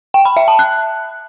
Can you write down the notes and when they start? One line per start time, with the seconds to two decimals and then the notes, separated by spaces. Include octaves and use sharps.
0.14 G5
0.25 B5
0.37 E5
0.48 A5
0.59 F#6